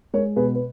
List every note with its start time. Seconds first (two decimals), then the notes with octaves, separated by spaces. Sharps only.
0.14 G#3 A#4 C#5
0.36 B2 G#4 B4
0.55 B4